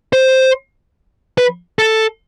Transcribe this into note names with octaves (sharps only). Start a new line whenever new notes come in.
C5
B4
A4